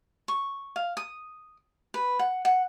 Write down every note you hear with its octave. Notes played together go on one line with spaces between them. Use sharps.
C#6
F5
D#6
B4
F#5
F#5